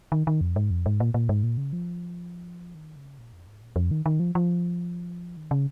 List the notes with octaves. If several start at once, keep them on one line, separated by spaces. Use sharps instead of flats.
D#3
D#3
F2
G#2
F2
G#2
A#2
A#2
G#2
A#2
C#3
F3
D#3
C#3
A#2
F2
G#2
A#2
F2
D#3
D#3
F3
F3
D#3
C#3